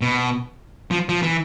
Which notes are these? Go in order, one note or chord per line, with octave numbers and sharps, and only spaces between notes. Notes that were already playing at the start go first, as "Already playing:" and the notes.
B2
F3
F3
E3